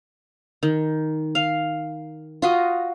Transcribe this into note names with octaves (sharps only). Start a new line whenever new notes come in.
D#3
F5
F4 F#4 D#5